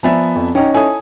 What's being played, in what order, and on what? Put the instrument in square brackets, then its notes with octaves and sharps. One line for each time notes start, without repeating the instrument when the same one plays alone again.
[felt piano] F3 B3 E5 [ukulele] D5 G#5 A#5
[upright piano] F2
[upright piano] C#4 D#4 [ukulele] G4 F#5 A#5
[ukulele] E4 A4 C#5 [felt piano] G#5 D#6